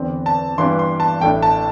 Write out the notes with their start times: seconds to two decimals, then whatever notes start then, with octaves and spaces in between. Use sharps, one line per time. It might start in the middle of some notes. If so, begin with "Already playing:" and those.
Already playing: E2 D3 C4
0.26 A5
0.58 G2 E3 G3 D4 C6
0.79 C6
1.00 A5
1.21 A1 A2 A3 D4 G5
1.43 A5